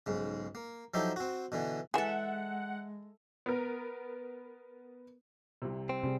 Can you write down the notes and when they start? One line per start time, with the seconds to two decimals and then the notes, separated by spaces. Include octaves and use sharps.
0.06 B1 G#2 C#3
0.55 A#3
0.94 F3 F#3 D#4 E4 G4 A4
1.16 C4 F#4
1.52 B2 D3 E3
1.94 E3 G#3 G#4 A4 E5 F#5
3.46 B3 A#4
5.62 C2 C3
5.89 C4
6.03 C3 G3 G#4